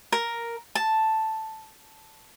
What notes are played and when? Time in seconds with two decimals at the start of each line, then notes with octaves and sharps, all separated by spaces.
0.12 A#4
0.75 A5